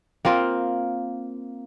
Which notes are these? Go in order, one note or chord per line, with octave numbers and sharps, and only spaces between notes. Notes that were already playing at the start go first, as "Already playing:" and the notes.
A#3 C4 F4 A#4